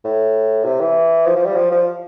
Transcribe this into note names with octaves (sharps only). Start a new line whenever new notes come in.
A2
C3
E3
F3
F3
G3
F3
F3